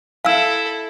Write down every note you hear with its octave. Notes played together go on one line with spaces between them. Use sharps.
E4 A4 F5 E6